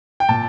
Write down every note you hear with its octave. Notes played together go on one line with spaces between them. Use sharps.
G5
A#2 A5